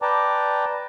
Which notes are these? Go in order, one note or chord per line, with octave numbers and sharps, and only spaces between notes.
B4 D5 G5 A5 A#5 D6